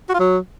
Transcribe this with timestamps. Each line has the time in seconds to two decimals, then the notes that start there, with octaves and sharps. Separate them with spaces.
0.09 F#4
0.14 F4
0.20 F#3